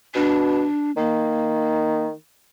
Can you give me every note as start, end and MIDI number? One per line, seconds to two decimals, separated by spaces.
0.15 0.64 47
0.15 0.91 62
0.97 2.12 51
0.97 2.05 58